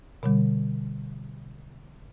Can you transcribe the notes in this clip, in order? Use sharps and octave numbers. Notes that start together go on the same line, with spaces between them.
B2 D3 G3